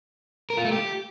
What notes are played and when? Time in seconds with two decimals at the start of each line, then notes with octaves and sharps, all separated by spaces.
0.50 A#4
0.57 F4
0.65 A3
0.72 G4